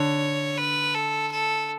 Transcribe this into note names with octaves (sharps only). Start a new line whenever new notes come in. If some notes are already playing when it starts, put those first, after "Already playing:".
Already playing: D3 C#5
B4
A4
A4